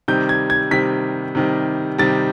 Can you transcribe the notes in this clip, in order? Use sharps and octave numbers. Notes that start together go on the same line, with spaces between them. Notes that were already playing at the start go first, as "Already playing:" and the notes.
C3 D#3 G3 G6
G#6
G#6
C3 D#3 G3 B6
C3 D#3 G3
C3 D#3 G3 A6